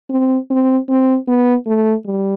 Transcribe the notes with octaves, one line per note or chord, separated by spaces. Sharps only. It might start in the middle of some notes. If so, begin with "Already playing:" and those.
C4
C4
C4
B3
A3
G3